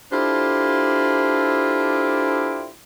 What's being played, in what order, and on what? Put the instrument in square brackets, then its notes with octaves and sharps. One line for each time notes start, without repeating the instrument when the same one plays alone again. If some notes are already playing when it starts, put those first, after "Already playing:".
[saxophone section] D4 E4 F4 G4 A4 C5